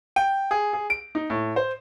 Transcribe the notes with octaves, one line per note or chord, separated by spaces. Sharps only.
G5
G#4
G#4
D7
D#4
A2
C5